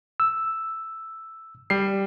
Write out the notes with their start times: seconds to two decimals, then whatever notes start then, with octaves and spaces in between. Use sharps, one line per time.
0.20 E6
1.70 G3 C7